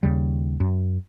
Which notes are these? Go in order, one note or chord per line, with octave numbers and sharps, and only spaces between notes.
D#2 C#3 G3
F#2